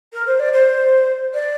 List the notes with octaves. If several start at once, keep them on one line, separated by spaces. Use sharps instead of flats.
A#4
C5
D5
C5
D5